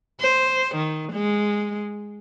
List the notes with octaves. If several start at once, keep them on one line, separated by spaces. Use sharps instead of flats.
C5
D#3
G#3